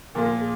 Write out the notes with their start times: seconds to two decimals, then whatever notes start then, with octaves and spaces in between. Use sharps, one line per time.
0.15 A#2 F3 A#3 F4 A#4
0.41 G#4